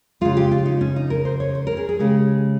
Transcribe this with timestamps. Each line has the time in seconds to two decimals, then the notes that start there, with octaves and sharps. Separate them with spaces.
0.21 C#3 G#3 F4
0.37 G4
0.51 F4
0.66 D#4
0.81 C#4
0.96 D#4
1.10 A#4
1.25 C5
1.40 C#5
1.55 C5
1.67 A#4
1.77 G#4
1.89 G#4
1.99 C#3 G#3 G4